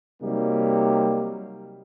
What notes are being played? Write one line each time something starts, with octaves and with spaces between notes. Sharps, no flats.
C3 F#3 G3 A#3 D#4 G4